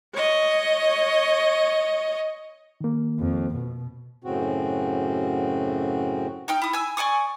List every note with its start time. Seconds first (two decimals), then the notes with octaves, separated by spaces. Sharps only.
0.14 C#5 D#5
2.81 D#3 A#3
3.19 F2
3.56 B2
4.24 F#2 A2 C#3 C4 F#4
6.48 D#4 G5 F6
6.62 E4 D#6
6.73 G#5 E6
6.97 D5 G#5 C#6 D#6